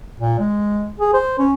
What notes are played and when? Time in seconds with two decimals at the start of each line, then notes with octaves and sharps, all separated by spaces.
0.20 A#2
0.39 G#3
1.00 G#4
1.13 C5
1.38 C#4